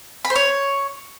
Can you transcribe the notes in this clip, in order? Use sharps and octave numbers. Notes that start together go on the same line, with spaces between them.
B5
C5
C#5